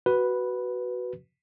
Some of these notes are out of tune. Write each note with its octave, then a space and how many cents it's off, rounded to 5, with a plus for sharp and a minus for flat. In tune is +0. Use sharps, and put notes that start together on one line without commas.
F#4 +10 B4 +0